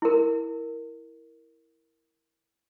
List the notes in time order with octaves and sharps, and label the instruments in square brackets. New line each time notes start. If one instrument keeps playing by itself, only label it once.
[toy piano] E4 A#4